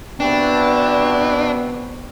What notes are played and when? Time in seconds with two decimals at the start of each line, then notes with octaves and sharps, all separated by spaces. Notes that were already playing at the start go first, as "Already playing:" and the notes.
0.20 C3 B3 D4 E4 F#4 G5